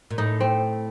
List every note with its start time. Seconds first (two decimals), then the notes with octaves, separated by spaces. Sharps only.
0.11 A#2
0.18 A2 D#4
0.40 C4